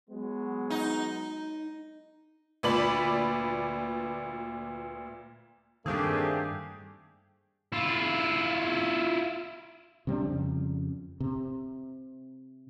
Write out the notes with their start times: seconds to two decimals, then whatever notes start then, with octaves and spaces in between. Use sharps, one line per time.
0.10 F#3 G#3 B3
0.70 D#4
2.63 D2 A#2 B4 D5 B5 F#7
5.86 G2 D#3 A3 A#3 C4 D4 G4 G#4
7.72 E4 F4
10.07 C3 G3 C4 D4
10.25 F2 C#3
11.20 C3